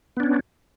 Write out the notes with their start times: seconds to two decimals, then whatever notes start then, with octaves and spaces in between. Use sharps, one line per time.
0.17 B3
0.20 D4
0.23 C#4